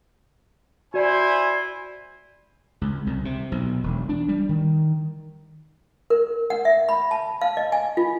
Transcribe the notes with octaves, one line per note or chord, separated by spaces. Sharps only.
E4 F#4 C5 D5 G#5
C#2
C2
C3
B1
E1
D4
G3
D#3
A#4
F#5
E5
B5
A5
F5
D#5
G#5
F4